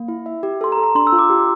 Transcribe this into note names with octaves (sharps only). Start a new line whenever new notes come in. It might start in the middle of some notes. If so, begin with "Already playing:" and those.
Already playing: A#3
E4
E5
G4
A4 C6
A#5
A4
A#5
D4 C6
E6
F4
D6
G4